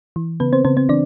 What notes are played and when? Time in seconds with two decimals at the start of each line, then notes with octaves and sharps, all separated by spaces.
0.16 E3
0.40 C#3 B3 B4
0.53 C4 C5
0.65 C#3 C4 C5
0.77 C4 C5
0.89 E3 D4 D5